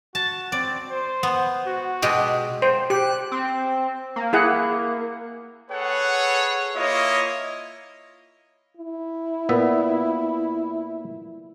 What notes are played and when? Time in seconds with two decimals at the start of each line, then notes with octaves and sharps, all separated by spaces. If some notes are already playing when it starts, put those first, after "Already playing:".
0.15 F#4 A5
0.52 C4 D5
0.91 C5
1.23 B3
1.67 F#4
2.02 B2 G#3 G4
2.62 C5
2.90 G4 F#6
3.32 C4
4.16 A#3
4.33 E4 G#4 F#5
5.71 G#4 A4 B4 C#5 F#5
6.76 A#3 E4 F4 C#5 D#5
8.77 E4
9.49 A#2 B3 E5